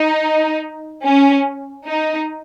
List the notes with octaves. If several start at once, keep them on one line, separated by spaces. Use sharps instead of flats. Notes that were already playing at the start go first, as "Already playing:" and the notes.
Already playing: D#4
C#4
D#4